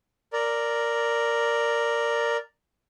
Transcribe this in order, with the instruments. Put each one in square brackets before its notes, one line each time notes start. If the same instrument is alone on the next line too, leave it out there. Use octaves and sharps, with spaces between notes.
[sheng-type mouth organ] A#4 D5